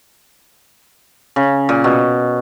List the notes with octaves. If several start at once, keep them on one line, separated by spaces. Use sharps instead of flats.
C#3
A#2
B2